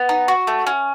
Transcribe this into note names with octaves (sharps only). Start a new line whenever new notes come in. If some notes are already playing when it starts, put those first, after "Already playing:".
Already playing: B3
D#4
F#4
A3
C#4